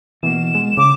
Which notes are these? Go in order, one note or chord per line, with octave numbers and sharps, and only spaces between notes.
B2 E3 A#3 E7
G#3
C#3 D6